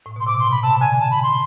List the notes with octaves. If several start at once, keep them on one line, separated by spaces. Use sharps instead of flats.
A2
B2 C6
C3 D6
C6
B2
B5
C3 A5
D3 G#5
A5
B5
C6